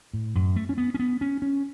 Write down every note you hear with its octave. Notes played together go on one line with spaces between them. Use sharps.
A2
F#2
A3
C#4
B3
C#4
B3
C#4
C#4